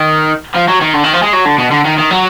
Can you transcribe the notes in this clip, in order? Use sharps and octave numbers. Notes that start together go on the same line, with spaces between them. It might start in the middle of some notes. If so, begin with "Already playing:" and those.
Already playing: D#3
F3
F#3
D#3
D3
D#3
F3
G#3
F#3
D3
B2
D3
D#3
D#3
F#3